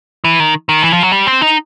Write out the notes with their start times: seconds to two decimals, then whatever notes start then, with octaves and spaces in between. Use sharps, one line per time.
0.24 E3
0.40 D#3
0.69 D#3
0.83 E3
0.92 F3
1.03 F#3
1.12 G3
1.27 C4
1.41 D#4